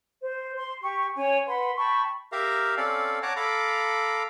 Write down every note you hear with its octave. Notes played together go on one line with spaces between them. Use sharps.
C5
C6
G4 C#6
C#4 C#5 G#5
B4 F#5 B5 C6
G5 A5 B5 C#6
G4 A#4 E5 F5 A#5
C4 C#4 A4 D5 F5
C#5 F#5 A5 A#5 D6
A4 F5 A#5 B5 D6